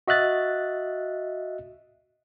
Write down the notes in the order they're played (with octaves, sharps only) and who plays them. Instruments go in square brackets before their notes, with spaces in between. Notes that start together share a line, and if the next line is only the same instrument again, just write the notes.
[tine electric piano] F#4 D#5 E5 F#6 A6